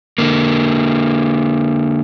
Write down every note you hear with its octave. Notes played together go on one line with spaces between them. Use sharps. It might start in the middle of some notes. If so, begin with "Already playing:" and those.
D3 A#3